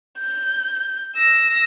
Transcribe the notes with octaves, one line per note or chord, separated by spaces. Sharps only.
G6
E6 A#6